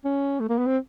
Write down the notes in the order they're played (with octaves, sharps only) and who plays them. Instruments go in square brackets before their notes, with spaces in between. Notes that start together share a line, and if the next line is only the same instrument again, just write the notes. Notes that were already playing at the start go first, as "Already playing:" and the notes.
[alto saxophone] C#4
A3
A#3
B3
C4